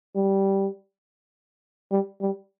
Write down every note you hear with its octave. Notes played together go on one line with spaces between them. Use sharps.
G3
G3
G3